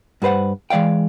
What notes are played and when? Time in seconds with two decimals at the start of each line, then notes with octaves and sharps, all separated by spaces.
0.22 G2 F#4 B4 C5 F#5
0.70 E3 G#3 D5 F5 G5